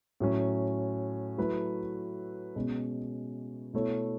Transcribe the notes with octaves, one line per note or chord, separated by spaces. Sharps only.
A2 F#3 C#4
F#3 A3 E4 B4
B2 G#3 C#4
B2 A3 E4 A4 C#5